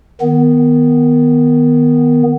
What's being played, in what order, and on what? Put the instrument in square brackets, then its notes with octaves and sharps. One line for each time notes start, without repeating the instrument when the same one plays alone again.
[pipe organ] D#3 B3